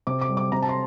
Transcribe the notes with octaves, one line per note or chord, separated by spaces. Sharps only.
C3 D6
D6
G3
D6
C3 A#5
A5
C6